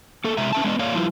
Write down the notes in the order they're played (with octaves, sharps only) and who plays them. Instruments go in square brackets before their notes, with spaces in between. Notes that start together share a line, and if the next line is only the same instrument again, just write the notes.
[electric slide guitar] A#3 A4
C3 G#3 E5 A#5
C#4 E5 A5
G#3 B3 D4 C5 D#5
A#3 C#5 D5 F5
F3 G3 E4 F4